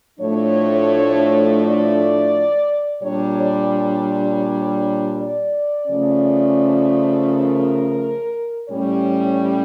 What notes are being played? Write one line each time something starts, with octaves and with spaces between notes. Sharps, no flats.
A2 F3 A3 D4 C#5
D5
A#2 G3 D4 C#5
D5
C#5
D5
C#3 F3 A3 C#4
A#4
A2 G3 C#4 C#5